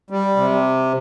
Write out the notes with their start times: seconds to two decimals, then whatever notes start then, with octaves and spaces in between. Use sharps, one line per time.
0.10 G3
0.36 C3